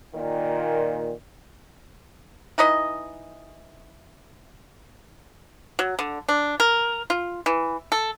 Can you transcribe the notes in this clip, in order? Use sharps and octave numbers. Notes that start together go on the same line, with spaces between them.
A#2 D#3
E3 D#4 B4 D#5
F#3
D3
D4
A#4
F4
E3
A4